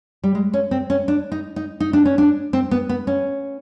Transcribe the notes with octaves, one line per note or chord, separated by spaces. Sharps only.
G3
G#3
C#4
C4
C#4
D4
D#4
D#4
D#4
D4
C#4
D4
C4
B3
B3
C#4